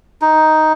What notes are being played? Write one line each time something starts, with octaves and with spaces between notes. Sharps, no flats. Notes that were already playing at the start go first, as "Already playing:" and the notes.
D#4